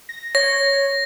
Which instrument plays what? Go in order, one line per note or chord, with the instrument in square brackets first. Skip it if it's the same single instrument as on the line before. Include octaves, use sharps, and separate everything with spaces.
[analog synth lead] A#6
[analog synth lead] C#5 [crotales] A#6